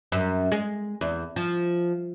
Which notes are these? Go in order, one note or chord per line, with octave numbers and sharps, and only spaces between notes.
F#2
G#3
E2
F3